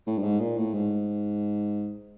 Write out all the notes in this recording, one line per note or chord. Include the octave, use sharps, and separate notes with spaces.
A2
G2
G#2
A#2
A2
G#2